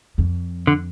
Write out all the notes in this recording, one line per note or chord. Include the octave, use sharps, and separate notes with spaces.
F2
D3